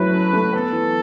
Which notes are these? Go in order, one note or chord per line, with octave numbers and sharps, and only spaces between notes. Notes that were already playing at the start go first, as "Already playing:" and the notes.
Already playing: F#3 A3 C#4 E4 B4
C#4
A3
B3 A4
E3